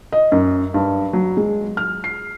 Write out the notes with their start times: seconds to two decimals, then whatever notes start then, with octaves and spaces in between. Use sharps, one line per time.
0.12 D#5
0.32 F#2
0.74 G2
1.13 F#3
1.37 G#3
1.77 F6
2.04 C7